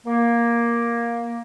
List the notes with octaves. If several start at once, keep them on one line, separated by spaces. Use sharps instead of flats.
A#3